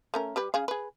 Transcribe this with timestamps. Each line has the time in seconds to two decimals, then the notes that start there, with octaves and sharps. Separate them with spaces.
0.14 A3 C#4 A#4
0.36 G3 G4 B4
0.54 C#3 G#4 F5
0.68 G#4 B4